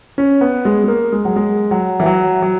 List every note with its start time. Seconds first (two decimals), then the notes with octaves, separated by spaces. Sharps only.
0.18 C#4
0.41 B3
0.65 G#3
0.84 G#3
0.88 A#3
1.12 G#3
1.25 F#3
1.36 G#3
1.71 F#3
2.00 E3
2.06 F#3
2.42 F#3